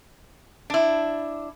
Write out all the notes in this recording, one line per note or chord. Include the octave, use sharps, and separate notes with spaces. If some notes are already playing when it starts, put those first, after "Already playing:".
D4 E4